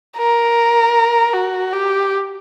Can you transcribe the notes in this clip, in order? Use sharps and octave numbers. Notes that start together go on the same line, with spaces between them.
A#4
F#4
G4